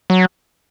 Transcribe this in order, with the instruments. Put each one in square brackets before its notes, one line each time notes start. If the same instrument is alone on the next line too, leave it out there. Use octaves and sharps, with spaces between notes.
[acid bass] F#3